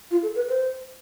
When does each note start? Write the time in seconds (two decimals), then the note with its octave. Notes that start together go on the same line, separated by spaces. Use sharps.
0.11 F4
0.23 A4
0.35 B4
0.49 C5